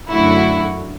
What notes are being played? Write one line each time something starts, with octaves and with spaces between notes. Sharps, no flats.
F#2 D3 F#3 A3 E4 F#4